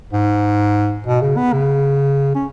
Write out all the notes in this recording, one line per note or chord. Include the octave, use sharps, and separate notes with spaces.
G#2
B2
C#3
B3
C#3
C#4